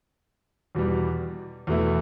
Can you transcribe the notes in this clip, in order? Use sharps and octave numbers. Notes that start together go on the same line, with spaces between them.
E2 B2 G3
E2 B2 A3 E4